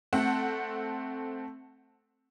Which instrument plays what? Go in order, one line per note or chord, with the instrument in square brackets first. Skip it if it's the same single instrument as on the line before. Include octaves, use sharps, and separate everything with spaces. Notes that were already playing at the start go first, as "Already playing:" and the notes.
[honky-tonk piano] A3 C4 A4 F#5